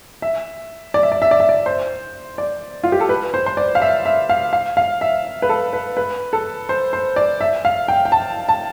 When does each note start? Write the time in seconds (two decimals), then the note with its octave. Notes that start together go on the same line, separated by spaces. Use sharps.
0.22 E5
0.94 D5
1.03 E5
1.12 D5
1.22 E5
1.31 D5
1.40 E5
1.49 D5
1.66 C5
2.38 D5
2.84 F4
2.92 G4
3.00 A4
3.09 B4
3.34 C5
3.46 C5
3.57 D5
3.75 F5
3.82 E5
4.05 E5
4.29 F5
4.53 F5
4.77 F5
5.01 E5
5.42 B4
5.49 A4
5.73 B4
5.97 B4
6.33 A4
6.69 C5
6.93 C5
7.16 D5
7.41 E5
7.65 F5
7.88 G5
8.05 G5
8.12 A5
8.49 A5